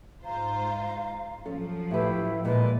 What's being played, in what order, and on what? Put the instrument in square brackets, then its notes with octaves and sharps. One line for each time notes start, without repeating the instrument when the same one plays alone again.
[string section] G#2 F4 C5 [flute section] F5 A#5
[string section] F3 F#3 [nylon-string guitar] C#4 A4
[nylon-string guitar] A2 B4 [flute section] E4 G4
[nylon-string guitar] A#2 G#3 [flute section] B4 D5 D#5